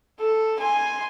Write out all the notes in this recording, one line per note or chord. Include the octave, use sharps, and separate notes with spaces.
A4
G#5 C6